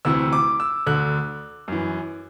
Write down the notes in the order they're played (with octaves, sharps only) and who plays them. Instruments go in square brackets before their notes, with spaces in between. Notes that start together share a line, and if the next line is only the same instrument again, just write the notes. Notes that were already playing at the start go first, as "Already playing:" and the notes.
[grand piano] D2 C3 E3 E6
D6
E6
D2 D3 F#6
F#2 E3